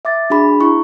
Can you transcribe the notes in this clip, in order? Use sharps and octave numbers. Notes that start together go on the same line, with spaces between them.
E5 D6 A6
D4 F#4 G#4 B5
E4 C#6